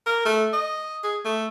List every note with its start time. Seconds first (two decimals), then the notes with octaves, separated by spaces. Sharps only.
0.06 A#4
0.25 A3
0.53 D#5
1.04 G#4
1.25 A3